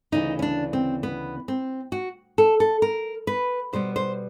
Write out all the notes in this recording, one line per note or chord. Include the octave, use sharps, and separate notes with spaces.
D2 C#3 E3 D#4
C#4
D4
C4
B3
C4
F#4
A4
A4
A#4
B4
B2 G3 B3 C5
C5